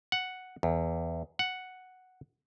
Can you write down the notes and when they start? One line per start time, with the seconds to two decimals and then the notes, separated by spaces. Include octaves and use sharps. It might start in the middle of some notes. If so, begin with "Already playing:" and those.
0.12 F#5
0.63 E2
1.39 F#5